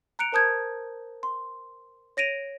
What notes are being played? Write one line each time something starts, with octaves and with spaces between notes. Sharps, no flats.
A#5 F#6 C#7 D7 F7
A#4 C5 A5 D#6 G6 G#6
C6
C#5 A#6 D7 D#7 F7